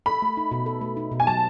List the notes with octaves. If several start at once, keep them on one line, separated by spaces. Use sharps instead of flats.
A4 B5
A3
D#4
B2
A4
A3
D#4
B2
G#5
F#3 A5